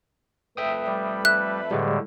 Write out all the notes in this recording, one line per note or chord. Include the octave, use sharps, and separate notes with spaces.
F2 A3 B4 E5 G5 D#6
G3
E5 F#6
A2 D3 G3 G#3